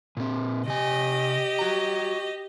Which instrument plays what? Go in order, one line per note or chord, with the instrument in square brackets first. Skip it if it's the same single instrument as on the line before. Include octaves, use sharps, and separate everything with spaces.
[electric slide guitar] A#2 C4
[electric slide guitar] C3 G#5 [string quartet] G4 D#5
[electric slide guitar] F#4 A#5